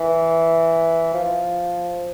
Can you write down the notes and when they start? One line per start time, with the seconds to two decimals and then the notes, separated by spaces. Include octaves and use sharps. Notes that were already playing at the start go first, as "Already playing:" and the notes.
Already playing: E3
1.14 F3